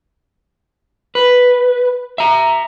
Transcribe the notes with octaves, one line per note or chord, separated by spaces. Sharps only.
B4
E5 A#5